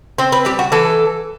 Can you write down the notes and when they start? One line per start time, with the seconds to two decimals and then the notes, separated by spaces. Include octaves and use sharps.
0.18 C4 C5
0.32 B4
0.45 G3 G4
0.59 F#4
0.72 E3 A4